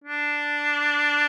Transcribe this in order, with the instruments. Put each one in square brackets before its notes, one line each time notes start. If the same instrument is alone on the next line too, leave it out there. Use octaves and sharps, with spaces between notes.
[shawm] D4